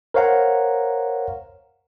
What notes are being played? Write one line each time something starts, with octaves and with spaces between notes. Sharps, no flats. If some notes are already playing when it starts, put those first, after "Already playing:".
A#4 C5 C#5 F5 F#5 A#5